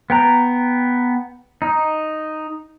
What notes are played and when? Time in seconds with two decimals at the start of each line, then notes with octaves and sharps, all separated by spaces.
0.10 B3 G5 A#5
1.62 D#4